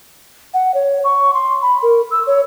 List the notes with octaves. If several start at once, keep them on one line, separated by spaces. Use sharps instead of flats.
F#5
C#5
C#6
C6
B5
A#4
E6
C#5